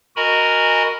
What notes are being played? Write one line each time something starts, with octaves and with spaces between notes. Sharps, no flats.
F#4 A#4 D#5 G#5 A#5 B5